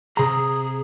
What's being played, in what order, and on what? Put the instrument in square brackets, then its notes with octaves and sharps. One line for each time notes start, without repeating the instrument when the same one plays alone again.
[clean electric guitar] C3 A#5 [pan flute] G#4